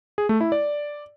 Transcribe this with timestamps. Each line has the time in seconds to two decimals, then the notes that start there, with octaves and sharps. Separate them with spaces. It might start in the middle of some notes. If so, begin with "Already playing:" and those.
0.18 G#4
0.29 A3
0.41 E4
0.52 D5